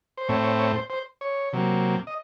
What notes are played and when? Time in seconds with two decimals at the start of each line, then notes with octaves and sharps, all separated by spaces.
0.18 C5
0.29 A2 A3 C4 C#5
0.43 C#5
0.59 C#5
0.75 C5
0.90 C5
1.21 C#5
1.53 C3 F#3 A#3
2.07 D#5